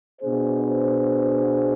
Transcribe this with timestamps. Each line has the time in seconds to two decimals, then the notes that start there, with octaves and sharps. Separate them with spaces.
0.21 B2 B3 D4 G#4 C5